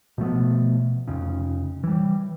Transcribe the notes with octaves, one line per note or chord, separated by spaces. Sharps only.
B2 F3 A3 B3
F1 C#3
E3 G3